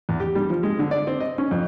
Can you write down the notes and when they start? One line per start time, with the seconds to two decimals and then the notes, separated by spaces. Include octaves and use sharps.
0.09 E2
0.20 G4
0.35 G3
0.50 F3
0.63 G#3
0.79 D3
0.91 D5
1.07 C4
1.20 D#5
1.38 C#4
1.51 F2